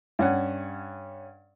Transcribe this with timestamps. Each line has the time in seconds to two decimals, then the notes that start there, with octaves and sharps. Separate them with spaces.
0.19 G2 C#4 F#5